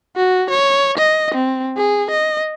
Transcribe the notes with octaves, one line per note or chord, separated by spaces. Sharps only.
F#4
C#5
D#5
C4
G#4
D#5